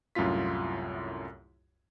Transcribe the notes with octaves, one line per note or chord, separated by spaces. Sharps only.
C2 F#2 A2 E4 F4 B6